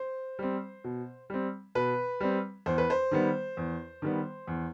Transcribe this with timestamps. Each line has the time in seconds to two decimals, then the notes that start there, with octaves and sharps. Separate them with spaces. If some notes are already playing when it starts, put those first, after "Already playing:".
Already playing: C5
0.39 G3 C4
0.84 B2
1.30 G3 C4
1.75 B2 B4
2.20 G3 C4
2.66 E2 C5
2.78 B4
2.90 C5
3.11 D#3 G3 B3
3.57 E2
4.02 D#3 G3 B3
4.47 E2